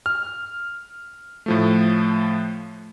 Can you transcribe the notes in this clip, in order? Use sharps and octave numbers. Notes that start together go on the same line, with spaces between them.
F6
A2 F3 A3